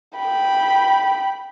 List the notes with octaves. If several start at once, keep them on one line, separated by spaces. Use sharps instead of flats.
G5 B5